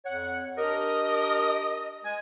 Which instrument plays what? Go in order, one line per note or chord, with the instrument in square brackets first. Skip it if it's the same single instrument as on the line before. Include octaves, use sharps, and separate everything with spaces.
[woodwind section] F2 C#5 F#5
[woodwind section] D4 G4 A#4 [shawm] D#5
[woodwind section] G#3 [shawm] G#5